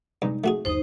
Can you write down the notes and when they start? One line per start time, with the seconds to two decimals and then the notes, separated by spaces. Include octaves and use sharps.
0.22 G2 C3 G#3 D#4
0.44 A3 F#4 G#4
0.65 G1 D#2 D#4 C5 D#6